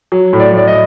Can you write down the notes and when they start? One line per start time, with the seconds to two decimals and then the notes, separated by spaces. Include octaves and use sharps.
0.12 F#3
0.33 A2
0.40 D5
0.54 A2 D5
0.68 D#5